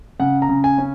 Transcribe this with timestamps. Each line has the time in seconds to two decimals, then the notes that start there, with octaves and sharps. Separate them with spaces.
0.20 C#3 F#5
0.42 A#5
0.49 C#3
0.64 G#5
0.78 C#4